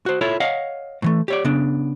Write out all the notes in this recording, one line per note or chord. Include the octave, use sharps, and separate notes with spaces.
F#4 C5
E4 F4 A4 C#5
C#5 D#5 F5 F#5
A2 E3 A3
G4 C#5 D5
C#3 B3 D4